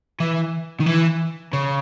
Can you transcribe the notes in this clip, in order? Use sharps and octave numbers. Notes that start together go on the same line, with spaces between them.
E3
D#3
E3
C#3